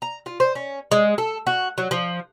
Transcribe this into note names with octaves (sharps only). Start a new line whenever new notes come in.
A#5
F4
C5
C#4
G#3
A4
F#4
F#3
F3